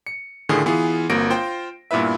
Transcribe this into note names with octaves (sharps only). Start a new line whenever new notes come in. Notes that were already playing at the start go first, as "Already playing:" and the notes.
C#7
A2 D3 D#3 F3 G#4
E3 B3 F4 G#4
G1 A#3 C4 F#4 A#6 D7
F4 C5 G5
G2 A#2 B3 E4 B4 E5